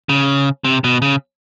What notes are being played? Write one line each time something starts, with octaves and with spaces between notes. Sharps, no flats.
C#3
C3
B2
C#3